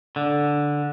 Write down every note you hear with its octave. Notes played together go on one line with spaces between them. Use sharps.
D3